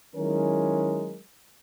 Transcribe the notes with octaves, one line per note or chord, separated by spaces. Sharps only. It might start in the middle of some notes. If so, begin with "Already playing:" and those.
D#3 F#3 G#3 C#4 E4 A#4